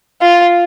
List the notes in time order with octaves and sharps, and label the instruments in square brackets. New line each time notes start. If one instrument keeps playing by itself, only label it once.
[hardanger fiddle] F4